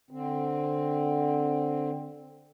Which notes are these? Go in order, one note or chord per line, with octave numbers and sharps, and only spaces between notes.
D3 C4